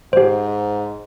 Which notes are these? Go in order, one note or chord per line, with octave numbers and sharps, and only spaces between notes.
G#2 G4 C5